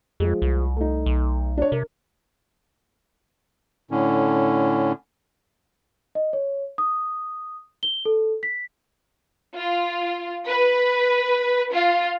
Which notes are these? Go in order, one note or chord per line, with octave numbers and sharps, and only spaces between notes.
F2 F3 G#3
C2
A3 D#4
B1
D4 C#5
C3 A#4
A2 D3 C#4
D#5
C#5
D#6
G7
A4
B6
F4
B4
F4